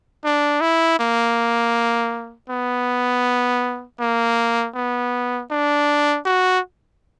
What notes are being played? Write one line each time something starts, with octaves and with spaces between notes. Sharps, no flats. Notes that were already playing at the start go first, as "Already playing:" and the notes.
D4
E4
A#3
B3
A#3
B3
D4
F#4